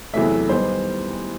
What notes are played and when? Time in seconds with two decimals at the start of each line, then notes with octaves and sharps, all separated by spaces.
0.14 E2 C3 F#3 A3 E5
0.49 D#3 G3 B3 C5